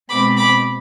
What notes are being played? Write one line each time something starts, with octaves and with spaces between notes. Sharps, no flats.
B2 G#3 C4 B5 D6
B5 D6